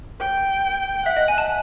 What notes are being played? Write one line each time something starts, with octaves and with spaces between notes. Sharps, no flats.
G5
E5 F#5
D#5
G#5
A5